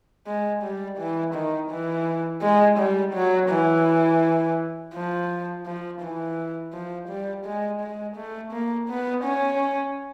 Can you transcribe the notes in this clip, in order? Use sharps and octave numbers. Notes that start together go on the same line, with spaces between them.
G#3
G3
E3
D#3
E3
G#3
G3
F#3
E3
F3
F3
E3
F3
G3
G#3
G#3
A3
A#3
B3
C#4